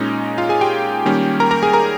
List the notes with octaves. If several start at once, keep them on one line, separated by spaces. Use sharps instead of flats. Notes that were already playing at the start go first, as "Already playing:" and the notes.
Already playing: A#2 G#3 C#4 D#4 D#5
F4 F5
G#4 G#5
G4 G5
D#3 G3 A#3 C#4
A#4 A#5
A#4 A#5
G#4 G#5
A#4 A#5